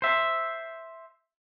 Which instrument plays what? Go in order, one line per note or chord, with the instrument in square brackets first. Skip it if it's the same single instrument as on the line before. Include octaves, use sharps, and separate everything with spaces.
[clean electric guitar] C5 E5